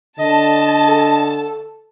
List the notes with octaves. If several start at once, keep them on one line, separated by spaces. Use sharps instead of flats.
D3 D#5 A5
A4